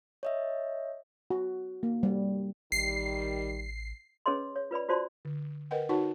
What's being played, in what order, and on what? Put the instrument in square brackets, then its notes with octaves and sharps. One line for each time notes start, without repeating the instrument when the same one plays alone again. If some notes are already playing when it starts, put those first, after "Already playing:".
[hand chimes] C#5 D#5 E5
[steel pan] F#4
A#3
G3
[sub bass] A1 [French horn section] D#3 G3 [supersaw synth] C7
[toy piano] C#4 G#4 B4 C#5 D#5 C6
C#5
F4 B4 D5 B5
F4 F#4 C5 D5 A5 C6
[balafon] D3
A#4 B4 D#5 F#5 G5
D#4 F#4 B4 C#5 F#5 A5